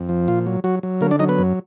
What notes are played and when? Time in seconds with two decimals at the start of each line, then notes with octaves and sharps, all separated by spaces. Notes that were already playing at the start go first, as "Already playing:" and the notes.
Already playing: F2
0.09 F3
0.28 A#2 F4
0.47 F#3
0.64 F#3 F#4
0.83 F#3
1.01 D3 A#3 A#4
1.11 D4 D5
1.19 F#3 D#4 D#5
1.29 B3 B4
1.39 F#2